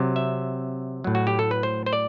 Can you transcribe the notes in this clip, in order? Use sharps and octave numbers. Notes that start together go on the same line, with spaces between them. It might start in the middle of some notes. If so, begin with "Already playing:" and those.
Already playing: C3 F#3
E5
A2 F#3
F#4
G4
A4
B4
C5
C5
D5